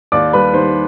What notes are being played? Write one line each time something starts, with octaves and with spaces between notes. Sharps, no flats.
D#2 D5 D6
G3 B4 B5
D#3 C5 C6